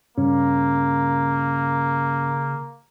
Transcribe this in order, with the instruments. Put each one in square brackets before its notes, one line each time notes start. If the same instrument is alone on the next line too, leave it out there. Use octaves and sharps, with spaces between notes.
[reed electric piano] G2 C#4 [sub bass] C#3 [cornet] A#3